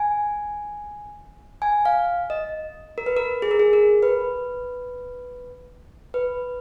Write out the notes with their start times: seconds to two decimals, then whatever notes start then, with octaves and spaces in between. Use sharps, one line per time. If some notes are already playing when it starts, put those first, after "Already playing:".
Already playing: G#5
1.62 G#5
1.85 F5
2.30 D#5
2.98 A#4
3.06 B4
3.17 A#4
3.42 G#4
3.51 A#4
3.59 G#4
3.73 A#4
4.03 B4
6.14 B4